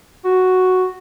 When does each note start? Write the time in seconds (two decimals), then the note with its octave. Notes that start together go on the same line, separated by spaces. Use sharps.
0.25 F#4